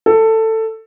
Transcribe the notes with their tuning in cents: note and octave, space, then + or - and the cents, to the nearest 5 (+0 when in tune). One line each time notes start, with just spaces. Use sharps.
A4 +15